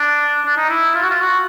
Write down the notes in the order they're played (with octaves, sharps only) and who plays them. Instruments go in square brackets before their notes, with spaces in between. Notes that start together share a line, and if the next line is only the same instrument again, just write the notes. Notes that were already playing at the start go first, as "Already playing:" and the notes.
Already playing: [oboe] D4
D4
D#4
E4
F4
F#4
F4
F#4